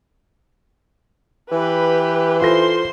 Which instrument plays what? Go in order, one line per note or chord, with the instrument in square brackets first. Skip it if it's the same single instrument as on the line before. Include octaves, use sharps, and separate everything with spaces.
[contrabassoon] E3 [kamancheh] G4 B4
[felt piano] F4 A4 A#6 [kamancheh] C5 C6